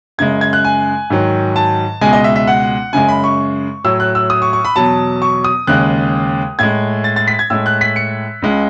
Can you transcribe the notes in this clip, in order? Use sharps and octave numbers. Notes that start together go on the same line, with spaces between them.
F#2 C#3 G#3 G#6
G#6
F#6
G#5
G#2 D#3 F#3
A5
C#2 B2 G#3 G#5
D#5
E5
E5
F#5
F#2 C#3 G#3 G#5
B5
C#6
A2 F#3 E6
F#6
E6
D#6
C#6
C#6
B5
E2 B2 F#3 A5
C#6
D#6
D#2 C#3 G#3 F#6
A2 G#3 G#6
A6
A6
B6
G#6
A2 G#3 E6
F#6
B6
C#7
C#2 C#3 G#3